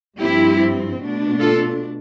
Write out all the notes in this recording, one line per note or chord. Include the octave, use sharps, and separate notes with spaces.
G2 F3 C4 E4 G4
B2 A3 D4
F4 A4